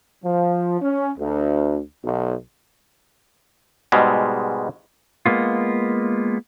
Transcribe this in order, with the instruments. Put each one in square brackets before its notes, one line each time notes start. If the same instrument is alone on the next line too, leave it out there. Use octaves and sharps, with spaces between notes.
[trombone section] F3
C#4
D2
B1
[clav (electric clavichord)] G#2 B2 G3 G#3
[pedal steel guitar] G#3 A#3 B3 F4